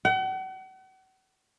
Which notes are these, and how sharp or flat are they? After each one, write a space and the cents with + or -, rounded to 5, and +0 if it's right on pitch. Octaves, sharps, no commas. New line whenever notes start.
F#5 +40